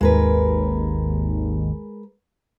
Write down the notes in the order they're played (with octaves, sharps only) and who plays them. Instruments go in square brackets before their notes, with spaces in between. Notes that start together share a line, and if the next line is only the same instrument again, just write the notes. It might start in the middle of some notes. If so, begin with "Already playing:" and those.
[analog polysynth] G#1 D#2 [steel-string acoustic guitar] G#3 A#4 B4